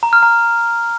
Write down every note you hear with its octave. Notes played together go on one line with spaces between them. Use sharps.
A#5
F6
A#5